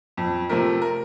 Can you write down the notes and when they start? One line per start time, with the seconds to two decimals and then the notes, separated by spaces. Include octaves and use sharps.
0.17 F2
0.49 C3 F3 A3 A#4
0.82 A#4